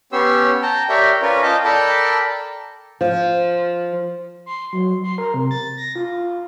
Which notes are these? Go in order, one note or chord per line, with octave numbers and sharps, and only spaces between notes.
B3 C#4 G4 C#5 C6 E6
G5 A5 A#5
G4 A#4 C#5 D5 E5 G5
C#4 F4 A#4 B4 C#5 D5
F4 D#5 G5 A5 D6
A4 A#4 D5 G5 A5 B5
F3
C6
F#3
C6
A#4
C3
A6
A#6
F4